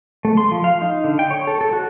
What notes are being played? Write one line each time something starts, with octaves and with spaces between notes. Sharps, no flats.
A3
C6
F3
F5
D#4
D3
G5
C#5
A4
A4
F#4